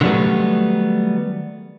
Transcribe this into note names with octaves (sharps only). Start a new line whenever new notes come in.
D3 D#3 F#3 G3 A3 B3